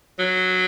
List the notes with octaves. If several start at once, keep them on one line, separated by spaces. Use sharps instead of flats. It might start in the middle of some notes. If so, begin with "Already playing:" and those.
F#3